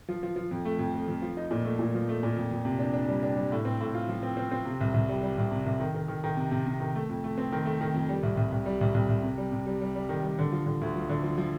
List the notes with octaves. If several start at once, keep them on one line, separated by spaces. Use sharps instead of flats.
F3
F3
F3
F2
A3
F2
F2
F2
F3
D#4
A#2
A3
A#2
F3
A3
A#2
F2
F2
C3
D4
D4
G3
D4
G3
A2
C4
A2
F4
F3
C4
C4
C4
C3
C2
C2
G3
G3
C2
C3
C2
D#3
D#3
D#3
D#3
C3
C3
C3
D#3
A3
F2
A3
C4
D#3
A3
D#3
F2
G3
C2
C2
C2
G3
C2
C2
C2
C3
G3
C3
G3
G3
G3
D#3
G3
D3
F3
D3
D2
F3
D3
F3
F3